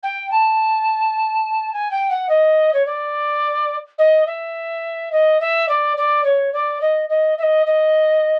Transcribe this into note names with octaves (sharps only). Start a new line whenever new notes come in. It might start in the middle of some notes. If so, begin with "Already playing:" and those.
G5
A5
G#5
G5
F#5
D#5
C#5
D5
D#5
E5
D#5
E5
D5
D5
C#5
D5
D#5
D#5
E5
D#5
D#5